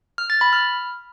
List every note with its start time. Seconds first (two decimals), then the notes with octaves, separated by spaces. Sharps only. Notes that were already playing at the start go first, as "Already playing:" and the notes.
0.18 F6
0.30 A6
0.41 B5
0.53 F6